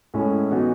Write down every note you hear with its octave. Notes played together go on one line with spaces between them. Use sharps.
A2 G#3 C#4 E4 A4
E3 B3 D#4 F#4